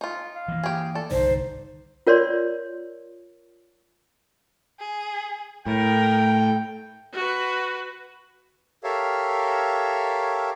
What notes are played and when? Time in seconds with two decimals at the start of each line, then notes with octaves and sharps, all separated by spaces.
0.01 D#4 F4
0.34 F5
0.48 E3 A#3
0.64 G4 G#4
0.95 A4 D5
1.11 G1 C2 D#3 D#4 C5
2.07 F4 A#4 C#5 D5 C6
4.79 G#4
5.66 A2 A#4 G5
7.13 F#4 B4
8.84 G4 A4 A#4 C#5 E5 F5